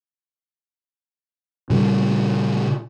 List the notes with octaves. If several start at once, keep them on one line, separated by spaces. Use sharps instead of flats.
A#2 C#3 G3